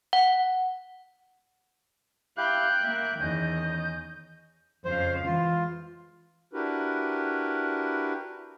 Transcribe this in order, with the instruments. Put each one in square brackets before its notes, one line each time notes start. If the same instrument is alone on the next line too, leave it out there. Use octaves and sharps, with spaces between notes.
[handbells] F#5
[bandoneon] E4 G4 F5 [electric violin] G5 F#6 [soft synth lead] G6
[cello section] A#3 [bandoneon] E5
[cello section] E2 D#3 [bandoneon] C#4 [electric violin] D#5
[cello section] F2 C#3 F5 [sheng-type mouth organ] C5
[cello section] E3 G#3 [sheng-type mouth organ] F4
[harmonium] D4 E4 F#4 G4 A#4 B4